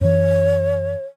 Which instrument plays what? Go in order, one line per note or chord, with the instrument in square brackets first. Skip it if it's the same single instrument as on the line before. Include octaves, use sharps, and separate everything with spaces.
[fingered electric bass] F#2 E3 [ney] C#5